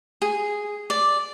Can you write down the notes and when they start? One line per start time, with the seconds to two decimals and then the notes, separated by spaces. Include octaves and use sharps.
0.22 G#4
0.90 D5